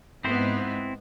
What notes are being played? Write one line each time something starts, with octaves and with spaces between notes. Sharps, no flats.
G#2 B3 C4 E4 C5